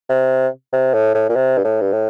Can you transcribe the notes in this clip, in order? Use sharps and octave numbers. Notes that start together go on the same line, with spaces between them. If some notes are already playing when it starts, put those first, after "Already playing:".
C3
C3
A2
A2
A#2
C3
G2
A2
G2
A2